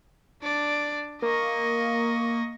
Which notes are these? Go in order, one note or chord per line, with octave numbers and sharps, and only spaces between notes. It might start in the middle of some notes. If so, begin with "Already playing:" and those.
D4 D5
A#3 D#5 C#6